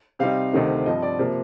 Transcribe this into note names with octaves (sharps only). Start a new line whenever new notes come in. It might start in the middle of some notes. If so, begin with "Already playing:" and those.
C3 G3 C4 D#4 F5
D2 C3 D#3 A3 D#4
G2 F3 C4 D#5
D5
C3 F3 A#3